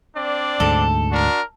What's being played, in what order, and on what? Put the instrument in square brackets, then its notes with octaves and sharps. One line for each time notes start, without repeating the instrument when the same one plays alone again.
[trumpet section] C4 D4 D5
[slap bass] D2 G#2 [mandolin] A4
[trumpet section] D4 F#4 A#4